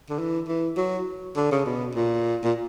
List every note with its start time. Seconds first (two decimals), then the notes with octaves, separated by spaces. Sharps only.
0.10 D3
0.19 E3
0.48 E3
0.77 F#3
1.36 D3
1.51 C#3
1.65 B2
1.95 A#2
2.43 A#2